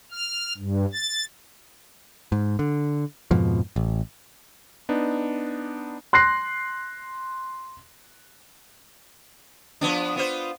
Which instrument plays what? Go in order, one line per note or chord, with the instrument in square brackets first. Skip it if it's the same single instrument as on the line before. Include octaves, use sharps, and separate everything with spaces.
[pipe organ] F6
G2
A6
[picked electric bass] G#2
D3
F2 G#2 B2 F3
A1
[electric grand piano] B3 D4 D#4
[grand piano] C6 F#6 A#6 C7
[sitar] F3 B3 D4
B3 F4 C5